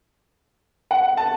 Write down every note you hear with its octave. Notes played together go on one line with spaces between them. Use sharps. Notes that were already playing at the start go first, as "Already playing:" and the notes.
F#5
A5